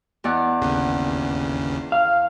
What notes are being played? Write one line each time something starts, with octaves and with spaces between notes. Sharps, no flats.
E2 D5 F#5
G1 D#2 C#3
F5